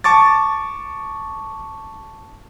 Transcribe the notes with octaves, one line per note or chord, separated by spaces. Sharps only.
A5 C#6 D6 A6